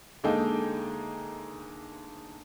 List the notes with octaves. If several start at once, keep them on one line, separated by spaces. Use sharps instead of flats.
D2 G#3 A#3 D#4 A4 G5